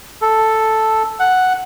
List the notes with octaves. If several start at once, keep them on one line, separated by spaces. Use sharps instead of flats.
A4
F#5